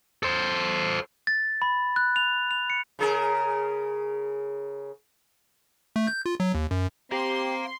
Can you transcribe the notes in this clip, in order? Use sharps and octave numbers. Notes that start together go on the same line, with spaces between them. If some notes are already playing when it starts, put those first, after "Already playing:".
A4 C5
A6
B5
F#6
F7
F7
C#7
C#3 G#4 A#4
A3
G6
F4
F#3
D#2
F#2
C4 G4 F5 A#5 C6